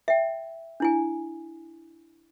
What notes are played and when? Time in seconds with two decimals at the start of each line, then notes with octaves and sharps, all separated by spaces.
0.08 E5 G5
0.80 D4 E4 G#5